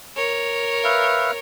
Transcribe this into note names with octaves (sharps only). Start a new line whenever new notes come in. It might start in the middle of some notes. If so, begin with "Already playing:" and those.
A#4 C#5
B4 E5 F5